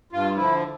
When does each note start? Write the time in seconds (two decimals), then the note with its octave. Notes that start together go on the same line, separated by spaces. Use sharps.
0.12 G2 F4
0.37 D3 F3 E4